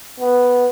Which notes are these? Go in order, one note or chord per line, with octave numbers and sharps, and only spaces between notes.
B3